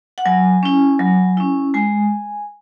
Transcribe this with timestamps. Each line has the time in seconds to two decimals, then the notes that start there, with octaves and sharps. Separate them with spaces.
0.18 F#5
0.26 F#3 G#5
0.63 C#4 E4
0.99 F#3
1.37 C#4 E4
1.74 G#3 G#5